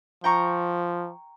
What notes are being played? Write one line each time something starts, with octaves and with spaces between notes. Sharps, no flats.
F3 G5 A#5 C#6